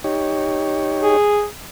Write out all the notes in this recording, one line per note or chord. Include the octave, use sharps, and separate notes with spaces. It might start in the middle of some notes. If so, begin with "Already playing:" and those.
D#4 G4 C#5
G#4